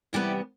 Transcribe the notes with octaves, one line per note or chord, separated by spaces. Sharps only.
E2 C3 G3 B3 E4 G4